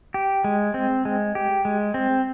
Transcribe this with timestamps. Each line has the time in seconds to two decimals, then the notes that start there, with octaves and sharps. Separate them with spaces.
0.14 G4
0.44 G#3
0.74 C4
1.05 G#3
1.35 G4
1.65 G#3
1.94 C4